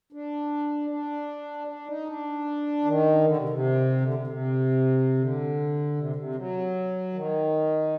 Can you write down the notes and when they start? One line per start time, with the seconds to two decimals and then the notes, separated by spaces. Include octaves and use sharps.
0.12 D4
0.90 D4
1.67 D4
1.87 D#4
2.07 D4
2.85 D#3
3.24 D3
3.36 C3
3.49 C3
4.01 D3
4.14 C3
4.27 C3
5.18 D3
5.96 C3
6.16 C3
6.35 F#3
7.13 D#3